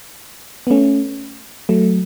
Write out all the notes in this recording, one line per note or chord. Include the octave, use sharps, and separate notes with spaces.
B3
A3 C#4
F#3 A3